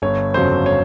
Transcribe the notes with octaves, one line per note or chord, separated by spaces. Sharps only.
G1 C#5
F2 C#3 F#3 C5
C#5